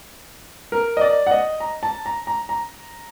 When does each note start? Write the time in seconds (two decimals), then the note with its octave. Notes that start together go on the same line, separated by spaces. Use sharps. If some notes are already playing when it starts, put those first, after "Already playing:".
0.72 A#4
0.97 D#5
1.01 D5
1.27 F#5
1.31 D#5
1.60 A#5
1.83 A5
2.06 A#5
2.27 A#5
2.49 A#5